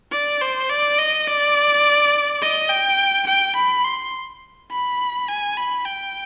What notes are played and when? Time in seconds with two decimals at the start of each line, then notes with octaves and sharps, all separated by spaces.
0.11 D5
0.41 C5
0.69 D5
0.99 D#5
1.27 D5
2.42 D#5
2.69 G5
3.27 G5
3.56 B5
3.84 C6
4.71 B5
5.29 G#5
5.57 B5
5.85 G5